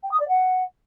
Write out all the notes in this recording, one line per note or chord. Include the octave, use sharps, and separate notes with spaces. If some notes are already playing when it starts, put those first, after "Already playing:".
G5
D#6
D5
F#5